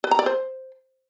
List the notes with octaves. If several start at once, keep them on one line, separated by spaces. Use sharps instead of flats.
B4
A#5
D5
C5